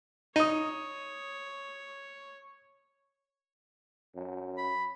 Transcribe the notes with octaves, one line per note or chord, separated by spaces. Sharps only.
D#4 C#5 D#6 D#7
F#2
B5